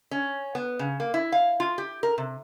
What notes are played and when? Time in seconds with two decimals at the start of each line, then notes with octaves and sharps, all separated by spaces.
0.11 C#4
0.55 B3
0.79 C#3
1.00 A#3
1.14 E4
1.32 F5
1.60 F4
1.78 G4
2.03 A#4
2.18 C3